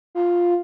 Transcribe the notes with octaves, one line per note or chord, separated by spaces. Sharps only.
F4